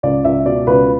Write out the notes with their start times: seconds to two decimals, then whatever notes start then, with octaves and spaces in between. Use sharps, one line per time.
0.03 C#2 D5
0.25 C#2 E5
0.45 B2 D5
0.67 C#2 B4